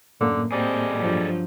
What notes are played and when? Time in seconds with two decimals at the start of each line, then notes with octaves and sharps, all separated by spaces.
0.21 F#2 A2 D3 A#3
0.52 G3 C4 G#4 A4 D#5
0.98 G2 F3 F#3